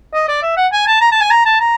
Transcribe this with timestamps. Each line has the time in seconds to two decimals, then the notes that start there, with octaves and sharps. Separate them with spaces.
0.14 D#5
0.28 D5
0.43 E5
0.57 F#5
0.73 G#5
0.87 A5
1.01 A#5
1.12 A5
1.21 G#5
1.31 A#5
1.46 A5
1.60 A#5